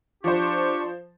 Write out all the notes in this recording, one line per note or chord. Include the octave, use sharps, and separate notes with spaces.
F3 D4 G4 C5 C#6